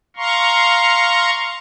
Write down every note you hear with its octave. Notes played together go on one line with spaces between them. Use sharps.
F5 A#5 C6 C#6